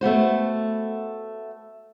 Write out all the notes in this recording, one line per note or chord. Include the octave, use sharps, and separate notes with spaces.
A3 B3 F#4 C5